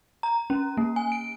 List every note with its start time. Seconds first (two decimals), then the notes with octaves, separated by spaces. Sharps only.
0.23 A#5
0.50 C#4
0.77 A#3
0.96 G#5
1.12 D7